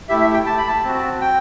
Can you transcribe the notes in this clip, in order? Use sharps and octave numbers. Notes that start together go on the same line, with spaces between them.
A3 E4 G4 E5
E5
G5
A5
B5
A5
C4 F#4
G5